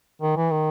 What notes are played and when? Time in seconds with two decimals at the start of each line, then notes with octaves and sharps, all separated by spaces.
0.22 D#3
0.37 E3
0.51 D#3